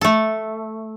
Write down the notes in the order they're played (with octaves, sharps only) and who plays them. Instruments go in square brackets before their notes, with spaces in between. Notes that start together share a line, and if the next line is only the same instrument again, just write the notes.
[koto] A3 A4